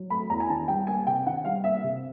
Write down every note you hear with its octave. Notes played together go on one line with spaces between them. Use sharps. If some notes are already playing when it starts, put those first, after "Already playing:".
Already playing: F#3
A3 B5
E2 A#5
G#5
D#3 A5
G3 G5
A#3 G#5
C3 G5
D#3 F#5
G3 F5
A#3 E5
C3